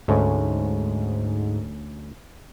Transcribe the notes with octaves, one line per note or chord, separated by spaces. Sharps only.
D2 G#2 A3 C#4